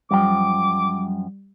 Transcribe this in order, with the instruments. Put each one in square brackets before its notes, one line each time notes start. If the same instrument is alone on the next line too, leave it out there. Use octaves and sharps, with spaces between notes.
[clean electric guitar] F#2 F3 G5 [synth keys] G3 [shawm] D6